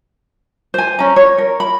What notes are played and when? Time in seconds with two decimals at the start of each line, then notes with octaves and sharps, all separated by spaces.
0.74 C5 G#5
0.99 C#4 A#5
1.16 C#5
1.38 A#4
1.60 B5